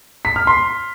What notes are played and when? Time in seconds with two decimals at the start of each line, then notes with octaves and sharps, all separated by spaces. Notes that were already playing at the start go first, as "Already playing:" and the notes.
0.25 B6
0.36 F6
0.47 C6